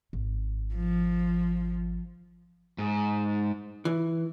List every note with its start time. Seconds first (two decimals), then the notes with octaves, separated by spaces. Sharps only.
0.13 G#1
0.74 F3
2.78 G#2
3.85 E3